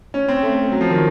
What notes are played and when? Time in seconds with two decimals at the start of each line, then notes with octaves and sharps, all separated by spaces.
0.14 C#4
0.28 C4
0.43 A3
0.72 F#3
0.81 F3
0.90 D#3